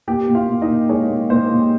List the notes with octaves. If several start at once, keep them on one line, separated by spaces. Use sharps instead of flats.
A#2 G4 G5
A#2
F4 F5
A#2
D#4 D#5
A#2
G#3 C#5
A#2
A#2 C5
A#2